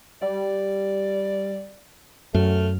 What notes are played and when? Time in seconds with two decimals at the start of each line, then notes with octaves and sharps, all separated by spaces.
0.22 G3 D5
2.34 F#2 A3 F6